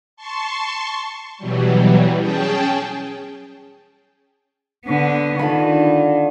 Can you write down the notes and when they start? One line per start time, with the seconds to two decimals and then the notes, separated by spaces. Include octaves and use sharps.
0.16 A5 C6 C#6
1.38 B2 E3 F#3 G3
2.17 C#4 G#4 G5 A5
4.86 D3 B3
5.39 D3 D#3 F4 B5